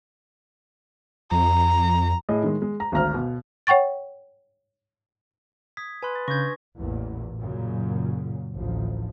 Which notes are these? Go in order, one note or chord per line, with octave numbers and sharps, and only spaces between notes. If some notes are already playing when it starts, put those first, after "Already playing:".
F2 A#5
A2 G#4 D#5
D#3 G#3
G#3
A#5
G#1 D2 A#5 F6
B2
C#5 F#5 G5 C#6 A6
D#6 G#6 B6
B4 G#5 B5 C6 F#6
A6
C#3 D4 B4 C#6 G6 G#6 A#6
A1 E2 A#2
F#2 A#2 C#3
A1 D2 F3